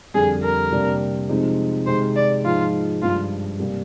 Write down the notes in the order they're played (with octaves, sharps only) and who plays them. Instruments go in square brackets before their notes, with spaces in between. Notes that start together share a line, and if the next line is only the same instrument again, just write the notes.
[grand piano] F2 D3 G3 [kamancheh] G#4
[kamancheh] A#4
[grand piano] C3 G3 A#3 D4
C3 F3 G#3 C4 D#4
[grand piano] C3 D#3 G#3 [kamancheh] C5
[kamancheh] D5
[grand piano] G#2 F3 G#3 D#4 [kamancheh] F4
[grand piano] G2 F3 G#3 [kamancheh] F4
[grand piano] C3 G3 A#3